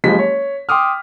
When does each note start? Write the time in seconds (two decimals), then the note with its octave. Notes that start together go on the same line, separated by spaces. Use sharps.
0.04 F#1 F3 G#3 G4 B6
0.19 C#5
0.69 G5 C6 D6 D#6 F6